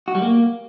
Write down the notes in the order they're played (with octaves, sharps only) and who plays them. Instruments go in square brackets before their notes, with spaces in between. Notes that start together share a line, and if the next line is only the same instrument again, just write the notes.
[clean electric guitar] F#4
G3
A#3